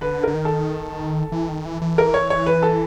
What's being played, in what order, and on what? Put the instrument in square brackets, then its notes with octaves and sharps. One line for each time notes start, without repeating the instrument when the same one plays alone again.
[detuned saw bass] D3 [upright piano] B4
[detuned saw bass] D3 [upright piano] A#4
[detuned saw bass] D#3
[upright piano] A4
[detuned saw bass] E3
D#3
E3
E3
[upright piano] A#4
C#5
C#5
B4
A4